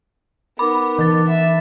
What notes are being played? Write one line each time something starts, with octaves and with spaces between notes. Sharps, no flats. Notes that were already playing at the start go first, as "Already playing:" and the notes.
B3 D#4 A#4 B5 D6
E3 A6
E5 B5